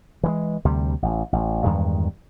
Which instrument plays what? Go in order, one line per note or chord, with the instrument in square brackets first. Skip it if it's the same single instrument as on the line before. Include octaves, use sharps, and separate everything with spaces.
[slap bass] E3 F3 G#3
D2 C3 G3
A1
A1
E2 G2 D#3 G#3